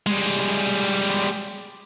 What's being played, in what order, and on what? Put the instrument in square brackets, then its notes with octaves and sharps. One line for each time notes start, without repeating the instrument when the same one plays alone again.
[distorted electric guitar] G3 G#3